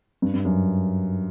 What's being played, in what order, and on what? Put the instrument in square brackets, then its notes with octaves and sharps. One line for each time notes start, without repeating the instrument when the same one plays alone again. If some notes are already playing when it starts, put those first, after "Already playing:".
[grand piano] G2
G2
F#2